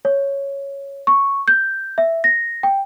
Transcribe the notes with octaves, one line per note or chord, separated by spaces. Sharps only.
C#5
C#6
G6
E5
A#6
G5